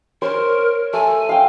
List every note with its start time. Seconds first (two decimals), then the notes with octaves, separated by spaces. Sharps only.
0.22 A#4 C5 C#5
0.94 A3 G#5
1.29 F5 G5